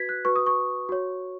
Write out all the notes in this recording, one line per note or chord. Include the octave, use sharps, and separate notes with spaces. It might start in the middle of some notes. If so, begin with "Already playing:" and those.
Already playing: F#4 B4 G#6 B6
F#6
F#4 B4 C#6
D#6
C#6
F#4 C#5